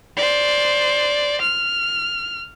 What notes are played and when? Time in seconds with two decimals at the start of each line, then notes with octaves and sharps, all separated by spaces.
0.17 C5 D5
1.41 F6